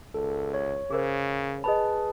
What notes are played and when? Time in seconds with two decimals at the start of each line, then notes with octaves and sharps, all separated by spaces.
0.14 C#2 A4
0.54 C#5
0.90 C#3 G#4 A#4 C5
1.64 G#4 B4 D#5 A5 B5